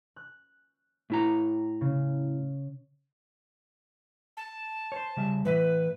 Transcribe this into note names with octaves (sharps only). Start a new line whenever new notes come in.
F#6
A2 E4 A#5
C#3
A5
C5 C#5
C#3 G3 E5
A2 E3 B4 E5